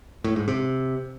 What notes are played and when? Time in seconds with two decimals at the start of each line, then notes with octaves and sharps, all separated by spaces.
0.24 A2
0.36 G#2
0.48 C3